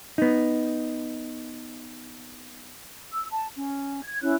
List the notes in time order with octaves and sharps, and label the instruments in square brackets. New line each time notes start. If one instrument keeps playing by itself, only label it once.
[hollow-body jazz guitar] B3 D#4
[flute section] E6
A5
C#4
G#6
C#4 E4 C#5 F#6